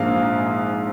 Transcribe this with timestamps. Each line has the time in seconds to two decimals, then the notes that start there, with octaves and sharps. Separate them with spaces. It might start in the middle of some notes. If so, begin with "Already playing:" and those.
Already playing: A#1 G#2 F3 A#3 F5